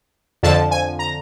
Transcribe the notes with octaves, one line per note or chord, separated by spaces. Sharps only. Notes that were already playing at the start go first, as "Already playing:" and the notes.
F2 D3 F3 A5
G#5
A#5